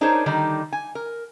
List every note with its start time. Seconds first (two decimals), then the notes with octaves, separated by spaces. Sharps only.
0.01 D4 D#4 G#4 A#4 C5 C#5
0.26 D3 D#3 G3 D#4
0.73 G#5
0.95 A#4